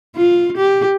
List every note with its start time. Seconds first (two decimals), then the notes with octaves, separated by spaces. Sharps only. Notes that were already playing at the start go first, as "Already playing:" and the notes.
0.16 F4
0.58 G4